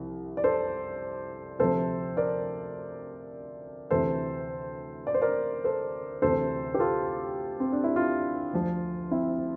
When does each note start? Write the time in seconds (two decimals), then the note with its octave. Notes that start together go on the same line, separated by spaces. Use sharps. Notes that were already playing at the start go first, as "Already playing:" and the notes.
Already playing: C2 C3 F3
0.37 D5
0.44 A4 C5
1.59 D2 C3 F3 A4 C5
2.17 A#4 D5
3.90 D2 C3 E3 A4 C5
5.07 D5
5.14 C5
5.22 A#4 D5
5.64 A4 C5
6.22 D2 C3 E3 A4 C5
6.74 G4
6.79 F4 A4
7.60 C4
7.72 D4
7.84 E4
7.95 D4 F4
8.53 D2 D3 F3
9.11 C4 E4